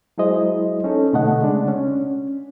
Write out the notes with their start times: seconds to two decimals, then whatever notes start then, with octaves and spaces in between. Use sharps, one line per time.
0.18 F#3 G#3 E4 G#4 C5 D#5
0.84 C#4 D#4 A4
1.13 B2 D3 A3 A4 D#5 F#5
1.40 C#3 G#3 D4
1.68 C#4